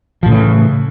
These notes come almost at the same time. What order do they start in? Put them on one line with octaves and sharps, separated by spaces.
F3 A2 C#3 E3